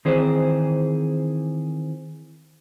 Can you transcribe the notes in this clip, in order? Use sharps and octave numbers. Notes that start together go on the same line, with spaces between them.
D#3 E3 C4 G#4 C5